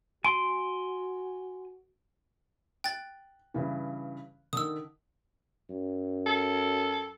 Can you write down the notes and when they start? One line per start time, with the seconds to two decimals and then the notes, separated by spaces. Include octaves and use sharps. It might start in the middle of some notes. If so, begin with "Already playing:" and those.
0.24 F#4 G#5 C6 D7
2.84 G5 F#6 A6
3.54 G2 C#3 E3
4.53 D3 D#3 D#6 E6
5.70 F#2
6.26 A4